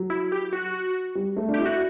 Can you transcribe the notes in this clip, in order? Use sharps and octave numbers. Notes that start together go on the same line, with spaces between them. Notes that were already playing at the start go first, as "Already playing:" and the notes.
Already playing: F#3
E4
G4
F#4
G3
A3
D4
E4 G4
F#4